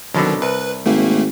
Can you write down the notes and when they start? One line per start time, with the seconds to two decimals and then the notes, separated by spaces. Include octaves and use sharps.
0.14 C2 B2 D3 D#3 F#3
0.42 C2 B4
0.86 G#1 A3 A#3